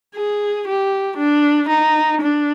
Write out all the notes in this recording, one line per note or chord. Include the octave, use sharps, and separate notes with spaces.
G#4
G4
D4
D#4
D4